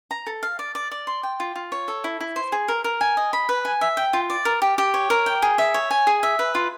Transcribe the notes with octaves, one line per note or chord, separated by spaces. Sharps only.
A#5
A4
F5
D5
D5
D5
C6
G5
F4
F4
C#5
A4
E4
E4
C5
G#4
A#4
A#4
G#5
D#5
B5
B4
G#5
E5
G5
F4
D5
A#4
G4
G4
C#5
A#4
G5
G#4
E5
C#5
G#5
G#4
E5
B4
F4